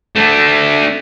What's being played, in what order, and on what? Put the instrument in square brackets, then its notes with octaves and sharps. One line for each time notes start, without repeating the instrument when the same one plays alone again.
[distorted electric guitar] A3 D4